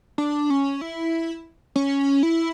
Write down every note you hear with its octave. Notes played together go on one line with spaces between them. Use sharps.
D4
C#4
E4
C#4
E4